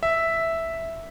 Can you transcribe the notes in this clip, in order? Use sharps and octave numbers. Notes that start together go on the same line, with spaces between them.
E5